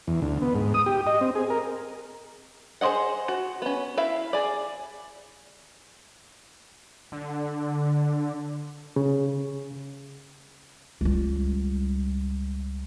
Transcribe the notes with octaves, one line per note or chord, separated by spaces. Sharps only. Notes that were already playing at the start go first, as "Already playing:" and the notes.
E2
D2
B3
G#2
D#6
G4
D#5
C4
G#4
A#4
G#4 C5 D5 D#5 F#5
F#4
B3 C#4
E4 E5 F5
G#4 D5
D3
C#3
C#2 G3